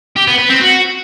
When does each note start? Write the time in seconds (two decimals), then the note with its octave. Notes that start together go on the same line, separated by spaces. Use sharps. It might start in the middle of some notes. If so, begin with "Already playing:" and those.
0.16 G4
0.27 B3
0.38 B4
0.49 C4
0.60 F#4